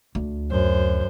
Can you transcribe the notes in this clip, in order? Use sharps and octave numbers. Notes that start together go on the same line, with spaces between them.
D2
F#2 C5